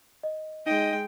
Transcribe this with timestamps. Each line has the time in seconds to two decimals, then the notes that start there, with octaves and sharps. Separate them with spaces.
0.23 D#5
0.66 G#3 D#4 D#5 G5